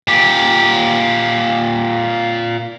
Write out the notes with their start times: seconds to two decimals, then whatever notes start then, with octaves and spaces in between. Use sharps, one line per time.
0.07 A#2 G4